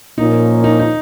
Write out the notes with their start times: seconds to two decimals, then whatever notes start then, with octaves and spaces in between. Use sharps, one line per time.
0.17 A#2 F3 A#3 C#4 D#4
0.64 D#4
0.79 D#4